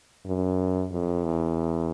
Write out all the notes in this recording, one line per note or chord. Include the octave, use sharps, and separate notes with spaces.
F#2
F2
E2